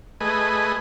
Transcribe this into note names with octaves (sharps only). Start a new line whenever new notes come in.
A3 G#4 B4 D#5